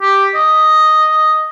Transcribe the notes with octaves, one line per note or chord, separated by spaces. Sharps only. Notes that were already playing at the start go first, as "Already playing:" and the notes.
G4
D#5